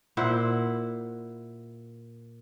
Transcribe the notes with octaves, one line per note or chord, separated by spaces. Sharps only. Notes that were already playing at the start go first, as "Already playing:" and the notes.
A#2 E4 C5 F#5